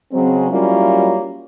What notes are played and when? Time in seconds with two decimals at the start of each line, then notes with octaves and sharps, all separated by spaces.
0.13 C#3 F#3 G#3 C4
0.50 F#3 G3 A#3 C#4 E4 F4